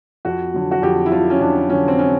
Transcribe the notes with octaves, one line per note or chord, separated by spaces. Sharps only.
F2 F#4
D3 F#3
F#4
F2 G4
E4
D3 F#3 F4
C#4
F2 D4
D3 F#3 C#4
C4
C#4